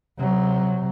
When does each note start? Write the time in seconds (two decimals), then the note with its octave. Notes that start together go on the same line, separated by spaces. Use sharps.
0.18 C3 F#3